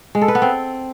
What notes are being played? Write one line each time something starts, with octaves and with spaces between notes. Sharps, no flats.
G#3
A4
B4
B3
C4